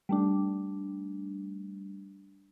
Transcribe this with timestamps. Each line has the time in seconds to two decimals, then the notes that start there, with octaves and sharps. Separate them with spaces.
0.09 G3 A3 D4